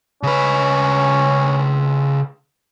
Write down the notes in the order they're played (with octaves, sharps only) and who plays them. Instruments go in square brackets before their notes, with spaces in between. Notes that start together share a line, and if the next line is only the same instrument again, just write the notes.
[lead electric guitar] C#3 B4 [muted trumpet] C#4